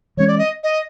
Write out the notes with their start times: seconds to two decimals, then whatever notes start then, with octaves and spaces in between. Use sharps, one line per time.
0.17 E3 G#3 C#4 C#5
0.28 D5
0.38 D#5
0.63 D#5